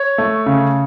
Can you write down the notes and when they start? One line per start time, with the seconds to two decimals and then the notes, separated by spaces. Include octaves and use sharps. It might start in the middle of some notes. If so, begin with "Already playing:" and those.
Already playing: C#5
0.18 A3
0.46 C#3